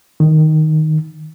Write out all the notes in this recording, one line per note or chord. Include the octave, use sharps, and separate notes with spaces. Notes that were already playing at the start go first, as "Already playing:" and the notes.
D#3